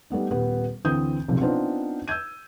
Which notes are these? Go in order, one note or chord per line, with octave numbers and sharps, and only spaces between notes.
G3 A3 B3 D#4
D#1 B3 G4 B4
D2 E3 C4 D#6 G6
F#1 B1 C3 F3
B3 C4 D4 D#4 F4 C5
E6 G6 G#6 D#7